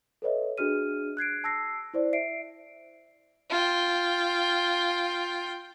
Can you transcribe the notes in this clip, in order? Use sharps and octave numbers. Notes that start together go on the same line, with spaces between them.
A4 B4 C#5 D#5 E5
D4 F#4 G#4 F6 D#7
F#6 G#6 C7 D7
A5 E6 A#6 C7
E4 C5 D5
E5 C7 D7
F4 G5